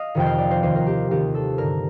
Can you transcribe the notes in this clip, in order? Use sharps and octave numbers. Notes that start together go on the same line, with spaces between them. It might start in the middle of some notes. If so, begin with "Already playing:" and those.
Already playing: D#5 F5
F2 C3 D#3 G5
F5
D5
C5
D#2 D#3 C5
A#4
G4
D#2 D#3 G4
A4
G2 D3 A#4